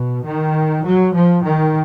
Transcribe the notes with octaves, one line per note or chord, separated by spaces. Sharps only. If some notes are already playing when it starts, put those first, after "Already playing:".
Already playing: B2
D#3
F#3
F3
D#3